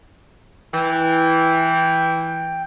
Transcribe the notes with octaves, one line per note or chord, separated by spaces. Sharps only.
E3 G5